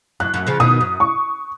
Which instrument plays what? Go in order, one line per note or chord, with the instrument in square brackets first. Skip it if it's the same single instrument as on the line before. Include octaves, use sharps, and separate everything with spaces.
[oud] F#2 [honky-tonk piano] F#6
[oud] F#2
C#3 F3
[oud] B2 D#3 [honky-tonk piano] D#6
[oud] F#2
[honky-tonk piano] C#6